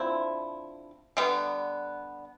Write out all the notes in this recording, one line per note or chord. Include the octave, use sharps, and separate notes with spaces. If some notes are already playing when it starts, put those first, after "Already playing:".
Already playing: D3 F3 C4 E4
D3 G3 B3